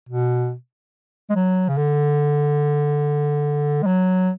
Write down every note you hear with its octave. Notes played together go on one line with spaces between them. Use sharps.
B2
G#3
F#3
C#3
D3
G#3
F#3